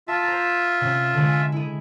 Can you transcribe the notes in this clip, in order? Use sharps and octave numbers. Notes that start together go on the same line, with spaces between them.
F4 E5 A5
C5 A#5
C3 C#4
D3 G#3
G#5
E4 G#4